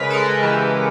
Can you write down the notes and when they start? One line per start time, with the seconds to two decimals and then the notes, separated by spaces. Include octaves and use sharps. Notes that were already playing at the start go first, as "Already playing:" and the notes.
Already playing: C#3 G#3 A#4 B4
0.10 A4
0.13 G#3 A#4
0.43 E3 G4